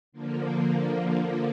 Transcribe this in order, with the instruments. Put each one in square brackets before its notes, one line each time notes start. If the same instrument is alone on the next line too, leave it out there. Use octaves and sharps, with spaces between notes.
[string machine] D3 F3 A#3